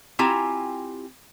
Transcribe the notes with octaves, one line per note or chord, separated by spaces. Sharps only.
C4 E4 F4 G4 G#5 A#5